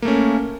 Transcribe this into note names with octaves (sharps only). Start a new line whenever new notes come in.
A3 A#3 C#4